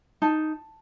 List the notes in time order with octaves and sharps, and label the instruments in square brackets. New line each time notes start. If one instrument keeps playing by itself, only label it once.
[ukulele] D#4 A5